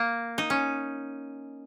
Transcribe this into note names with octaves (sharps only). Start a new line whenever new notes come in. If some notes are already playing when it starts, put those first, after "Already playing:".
Already playing: A#3
D#4
C#4